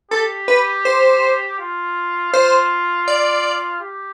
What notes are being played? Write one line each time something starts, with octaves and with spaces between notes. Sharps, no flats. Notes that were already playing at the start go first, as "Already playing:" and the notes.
G4 A4
B4
C5
F4
F4 C5
D5
G4